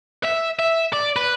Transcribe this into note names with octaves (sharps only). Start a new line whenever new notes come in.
E5
E5
D5
B4